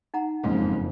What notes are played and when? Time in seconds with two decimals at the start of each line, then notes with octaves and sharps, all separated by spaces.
0.14 D#4 F#5 A#5
0.44 F#1 F2 G#2 C#3 G#3